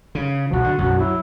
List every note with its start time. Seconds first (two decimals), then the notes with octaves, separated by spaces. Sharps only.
0.15 C#3
0.51 B1 F3 F#4
0.64 D3
0.78 B1 F#2 F#4
0.99 F#3 E4